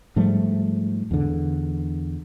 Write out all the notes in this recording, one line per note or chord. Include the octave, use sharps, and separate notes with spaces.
G#2 F3 G3 A3
E2 D3